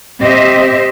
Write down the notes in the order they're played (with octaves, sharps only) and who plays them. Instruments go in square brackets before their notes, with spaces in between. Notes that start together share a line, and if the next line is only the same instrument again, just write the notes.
[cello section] C4 G4 C5 D#5 E5